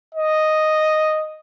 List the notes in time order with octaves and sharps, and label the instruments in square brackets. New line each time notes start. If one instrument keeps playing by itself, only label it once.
[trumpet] D#5